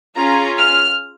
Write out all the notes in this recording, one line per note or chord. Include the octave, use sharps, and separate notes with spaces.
C#4 F4 G#4 A#5
F6